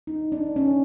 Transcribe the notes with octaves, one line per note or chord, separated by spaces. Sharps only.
D#4
D4
C#4